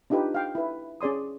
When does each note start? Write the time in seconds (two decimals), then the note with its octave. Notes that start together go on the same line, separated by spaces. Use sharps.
0.10 D4 D#4 F4 G4 B4
0.35 F5 G5
0.55 E4 B4
1.01 C#4 G#4 D5 C6 D#6